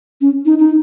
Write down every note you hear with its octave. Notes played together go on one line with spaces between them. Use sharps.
C#4
D#4
D#4